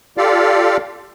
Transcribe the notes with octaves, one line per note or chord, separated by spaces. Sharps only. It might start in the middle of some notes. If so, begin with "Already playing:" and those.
F4 G4 A4 D5 F5